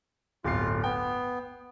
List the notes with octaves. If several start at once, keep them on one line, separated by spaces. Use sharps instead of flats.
D1 G1 F4 C7
B3 G5